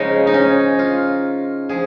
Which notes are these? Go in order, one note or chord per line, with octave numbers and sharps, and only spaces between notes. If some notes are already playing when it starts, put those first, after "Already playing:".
Already playing: C#3 F3 G#3 C#4 D#4
D#4
C#4
F4
F3 G#4